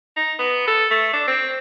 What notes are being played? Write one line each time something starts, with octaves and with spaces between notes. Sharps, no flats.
D#4
B3
A4
A3
D4
C4